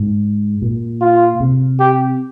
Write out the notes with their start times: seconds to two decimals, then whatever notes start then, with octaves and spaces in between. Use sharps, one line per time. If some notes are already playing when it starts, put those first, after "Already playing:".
Already playing: G#2
0.62 A#2
1.01 F4
1.40 C3
1.80 G4